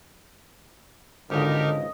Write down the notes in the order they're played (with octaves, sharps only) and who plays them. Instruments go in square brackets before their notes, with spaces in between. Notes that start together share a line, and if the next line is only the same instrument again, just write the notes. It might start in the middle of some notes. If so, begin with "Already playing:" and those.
[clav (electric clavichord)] G#1 C#2 [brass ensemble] D3 [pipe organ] D#4 G4 A#4 [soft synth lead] D#5